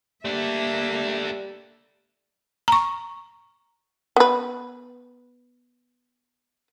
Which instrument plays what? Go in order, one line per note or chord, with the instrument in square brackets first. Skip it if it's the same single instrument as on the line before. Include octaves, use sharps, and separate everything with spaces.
[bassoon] G3 [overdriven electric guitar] A3 D4 [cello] A#3 E5
[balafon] A#5 C#6
[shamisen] B3 B4